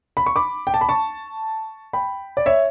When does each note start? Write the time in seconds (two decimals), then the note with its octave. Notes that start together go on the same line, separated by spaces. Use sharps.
0.17 B5
0.26 C#6
0.36 B5 D6
0.67 G5
0.74 A5
0.81 B5
0.89 A5 C#6
1.93 G5 B5
2.37 D5
2.46 C#5 E5